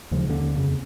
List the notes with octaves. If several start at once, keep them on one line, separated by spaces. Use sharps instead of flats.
D#2 C#3 F3 G#3
D#2 D3 A#3 C#4
F2 C#3